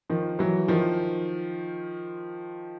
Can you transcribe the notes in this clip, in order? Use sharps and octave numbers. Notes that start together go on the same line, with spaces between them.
D#3 F3
E3 F#3
D#3 F3